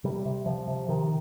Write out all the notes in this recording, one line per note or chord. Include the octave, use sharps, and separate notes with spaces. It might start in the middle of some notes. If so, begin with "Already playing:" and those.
C3 G3
C3
C3 F3
C3
C3 D#3